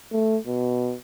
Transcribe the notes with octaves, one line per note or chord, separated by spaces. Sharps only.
A3
B2